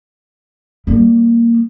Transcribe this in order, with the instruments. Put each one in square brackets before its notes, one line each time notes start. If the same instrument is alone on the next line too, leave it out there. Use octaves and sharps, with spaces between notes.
[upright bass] G3 A#3